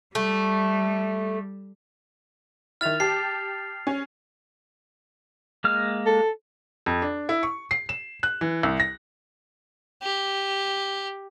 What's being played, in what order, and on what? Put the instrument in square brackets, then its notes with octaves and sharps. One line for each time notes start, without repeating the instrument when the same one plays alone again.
[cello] G3 [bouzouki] A3
[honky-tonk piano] D#3 E4 [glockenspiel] F6 A6 F7
[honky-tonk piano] G4 A5 [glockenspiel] C7
[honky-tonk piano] C#4
[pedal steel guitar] G#3 A#3 F6
[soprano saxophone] A4
[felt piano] F2
D4
E4
C#6
C7
E7
F#6
E3
C2
A#6
[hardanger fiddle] G4